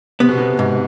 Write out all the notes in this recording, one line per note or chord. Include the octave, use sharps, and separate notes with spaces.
C3 B3
B2
C3
G#2